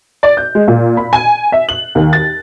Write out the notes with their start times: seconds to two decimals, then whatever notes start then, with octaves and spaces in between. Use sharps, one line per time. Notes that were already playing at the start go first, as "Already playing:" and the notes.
0.23 D5
0.37 G6
0.55 G#3
0.68 A#2
0.97 B5
1.13 G#5
1.52 E5
1.69 F#7
1.95 D#2
2.13 A6